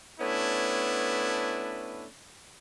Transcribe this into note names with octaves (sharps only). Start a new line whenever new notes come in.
A3 B3 C#4 D4 E4